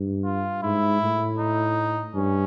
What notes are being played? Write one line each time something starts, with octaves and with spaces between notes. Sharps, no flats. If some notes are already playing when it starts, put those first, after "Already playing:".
Already playing: G2
F4
G#2 E4
A2
D#4
G2 C#4